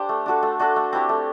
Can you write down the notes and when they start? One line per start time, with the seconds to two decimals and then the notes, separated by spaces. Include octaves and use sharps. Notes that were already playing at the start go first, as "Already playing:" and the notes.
Already playing: D4 G4 C5
0.09 A3
0.26 D4 F#4 A4
0.43 A3
0.59 D4 F#4 A4
0.76 A3
0.93 C4 E4 G4
1.09 A3